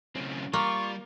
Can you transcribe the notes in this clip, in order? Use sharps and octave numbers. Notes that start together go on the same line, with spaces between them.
F#2 A2 C#3 C4 C#4
G3 A#3 F4 C#6